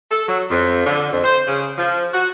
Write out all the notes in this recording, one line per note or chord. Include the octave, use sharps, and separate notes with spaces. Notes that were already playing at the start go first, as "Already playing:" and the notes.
A4
F#3
F2
D3
F2
C5
C#3
F3
F#4